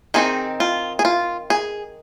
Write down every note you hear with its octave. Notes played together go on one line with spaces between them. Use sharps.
D#3 C4 D#4 G#4
F4
G#4
F4
G#4